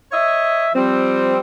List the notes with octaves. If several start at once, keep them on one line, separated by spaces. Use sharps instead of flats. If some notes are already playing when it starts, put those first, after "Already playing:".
C#5 D#5 E5
F3 G3 C4